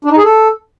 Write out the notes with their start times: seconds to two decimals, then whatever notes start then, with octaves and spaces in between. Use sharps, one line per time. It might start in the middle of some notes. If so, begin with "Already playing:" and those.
0.04 D4
0.11 D#4
0.17 G#4
0.24 A4